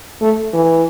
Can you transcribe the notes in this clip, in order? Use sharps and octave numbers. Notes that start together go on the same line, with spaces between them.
A3
E3